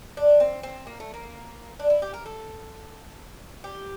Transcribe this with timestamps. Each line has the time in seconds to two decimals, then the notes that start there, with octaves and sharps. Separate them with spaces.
0.17 D4
0.40 C4
0.63 C4
0.87 A#3
1.00 A3
1.14 A#3
1.80 D4
1.90 E4
2.02 G4
2.14 A#4
2.26 A4
3.64 G4